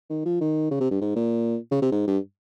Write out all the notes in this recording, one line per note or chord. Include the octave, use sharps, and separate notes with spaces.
D#3
F3
D#3
C#3
C3
G2
G#2
A#2
C#3
C3
G#2
G2